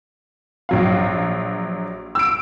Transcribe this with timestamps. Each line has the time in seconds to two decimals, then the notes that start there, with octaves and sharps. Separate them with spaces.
0.69 A#1 F#3 F5
2.15 E6 D7